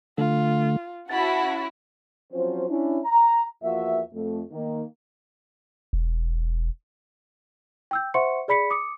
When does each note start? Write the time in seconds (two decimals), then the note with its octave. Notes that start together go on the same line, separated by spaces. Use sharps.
0.18 D3 A3 F4
1.10 C#4 E4 F#4 F#5 A5 B5
2.32 F3 F#3 C4 C#4 C5
2.69 C#4 D4 E4
3.05 A#5
3.63 E2 F3 A#3 F#4 E5
4.14 F2 A3
4.52 D#3 A#3
5.93 E1
7.91 G5 E6 G6
8.14 C5 E5 F#5 C6 C#6 C#7
8.48 G#4 D5 B5 B6 C#7
8.70 D6 D#6 C#7